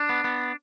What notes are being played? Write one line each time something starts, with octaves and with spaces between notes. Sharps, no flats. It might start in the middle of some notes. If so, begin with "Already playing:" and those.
Already playing: D4
B3
B3